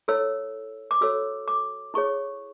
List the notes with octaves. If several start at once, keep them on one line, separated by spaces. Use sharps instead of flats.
E4 A4 C#5 E6
D6
F#4 A4 C#5 E6
D6
E4 G#4 C#5 C#6